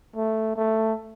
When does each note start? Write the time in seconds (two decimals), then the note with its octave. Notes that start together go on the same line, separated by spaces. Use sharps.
0.16 A3
0.56 A3